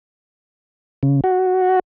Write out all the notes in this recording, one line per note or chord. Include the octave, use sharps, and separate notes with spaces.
C#3
F#4